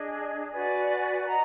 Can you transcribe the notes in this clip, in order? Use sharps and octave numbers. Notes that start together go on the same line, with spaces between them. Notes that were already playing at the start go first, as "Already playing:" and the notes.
Already playing: D4 G#4 D#5 G#5
F#4 B4 D5 G#5
D#5 F#5 A#5